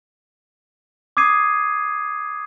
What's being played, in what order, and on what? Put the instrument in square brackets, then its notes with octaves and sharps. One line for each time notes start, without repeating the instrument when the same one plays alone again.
[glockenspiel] D6 D#6 G#6 C7 D#7